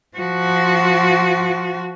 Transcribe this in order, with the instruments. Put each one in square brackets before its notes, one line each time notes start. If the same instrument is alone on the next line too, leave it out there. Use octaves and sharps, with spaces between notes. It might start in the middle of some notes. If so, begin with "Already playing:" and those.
[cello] F3 F#4